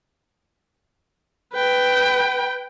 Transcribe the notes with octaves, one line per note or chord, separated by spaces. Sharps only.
B4 G5